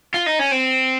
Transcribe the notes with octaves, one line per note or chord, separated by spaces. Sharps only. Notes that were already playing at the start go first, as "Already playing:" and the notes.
F4
D#4
C#4
C4